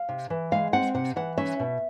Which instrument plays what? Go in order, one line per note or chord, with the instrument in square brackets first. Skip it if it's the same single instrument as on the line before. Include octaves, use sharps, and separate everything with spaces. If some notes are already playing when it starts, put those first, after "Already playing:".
Already playing: [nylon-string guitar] F5
C3
E3
G#3 F5
C4 F#5
C3 F#5
E3 F#5
C#4 E5
B2